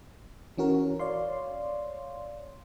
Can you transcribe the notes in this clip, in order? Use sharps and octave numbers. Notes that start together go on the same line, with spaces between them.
E3 C#4 F#4 A#4
C#5 D5 F5 C6